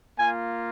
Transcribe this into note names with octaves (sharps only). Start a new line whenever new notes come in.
A#3 F4 G#5